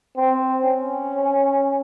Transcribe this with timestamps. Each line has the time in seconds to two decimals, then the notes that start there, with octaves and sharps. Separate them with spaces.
0.17 C4
0.65 C#4